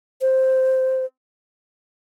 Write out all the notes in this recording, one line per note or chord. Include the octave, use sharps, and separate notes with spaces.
C5